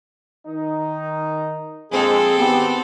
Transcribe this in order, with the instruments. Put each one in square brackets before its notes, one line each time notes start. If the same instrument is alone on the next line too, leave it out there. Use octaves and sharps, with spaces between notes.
[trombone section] D#3 D#4
[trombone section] A#1 F2 G#3 [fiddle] C4 A4 [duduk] G#4
[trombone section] G#1 G4 [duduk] B3